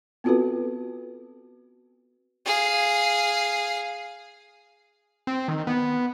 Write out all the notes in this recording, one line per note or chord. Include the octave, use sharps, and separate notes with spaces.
B3 C4 F4 F#4 A4 B4
G#4 F5
C4
D#3
B3